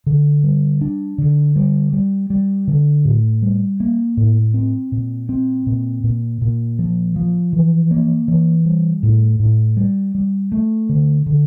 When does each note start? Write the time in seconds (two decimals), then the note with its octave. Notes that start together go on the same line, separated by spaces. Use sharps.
0.06 D3
0.44 G3
0.81 D4
1.18 D3
1.56 G3
1.93 G3
2.30 G3
2.67 D3
3.05 A2
3.42 G3
3.80 A#3
4.17 A2
4.54 C4
4.92 A#2
5.29 C4
5.66 A#2
6.04 A#2
6.42 A#2
6.79 F3
7.16 F3
7.53 E3
7.91 A#3
8.28 E3
8.65 G3
9.03 A2
9.40 A2
9.77 G3
10.15 G3
10.52 A3
10.89 D3
11.26 D3